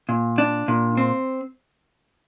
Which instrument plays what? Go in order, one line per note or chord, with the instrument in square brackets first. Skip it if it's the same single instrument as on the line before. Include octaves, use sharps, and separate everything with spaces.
[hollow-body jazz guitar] A#2
D4
A#2
C4